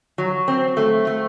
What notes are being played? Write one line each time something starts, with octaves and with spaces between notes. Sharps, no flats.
F#3
C4
A3
A3